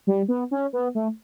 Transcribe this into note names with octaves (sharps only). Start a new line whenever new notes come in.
G3
B3
C#4
B3
A3